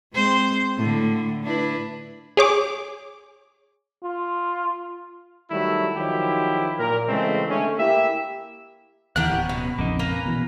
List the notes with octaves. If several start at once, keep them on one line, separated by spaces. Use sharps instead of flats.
G#3 C4 C5
A2 D3
D4 E4 B4
G#4 C#5 D6
F4
D#3 F#3 G3 A3 E4
D#3 F3 F#3 E4 G4
A#2 A#4
C#3 E3 G#3 A3 C4
D3 G#3 A3 C#4
A#3 E4 G4 E5
D#2 D3 E3 D4 G4 A#4 F#5 F#6
D1 F#3 B3 C#4
B2
A#1 F2 C#3 A#3 D#4
A#3 C#4 B4 A#5
B2 E3